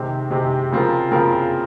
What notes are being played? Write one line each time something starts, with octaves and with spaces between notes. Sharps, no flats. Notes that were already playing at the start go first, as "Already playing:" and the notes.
Already playing: C3 D#3 G#3 C4 G4
C3 D#3 G#3 C4 G4
C#3 F3 C4 F4 A#4
C#3 F3 C4 F4 A#4